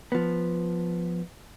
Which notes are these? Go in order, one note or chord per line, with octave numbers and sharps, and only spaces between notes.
F3 B3